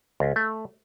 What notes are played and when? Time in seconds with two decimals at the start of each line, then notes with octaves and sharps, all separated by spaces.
0.20 C#2
0.36 A3